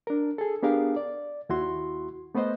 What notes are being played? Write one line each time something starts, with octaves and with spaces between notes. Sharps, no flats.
D4 A#4
G#4 A4
B3 D4 G4 G#4 A#4 F5
D5
D#2 E4 F#4 C6
A3 B3 B4 C5 D#5